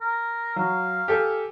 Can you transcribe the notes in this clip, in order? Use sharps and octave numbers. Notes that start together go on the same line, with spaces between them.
A#4
F#3 F5
G4 A4 G#5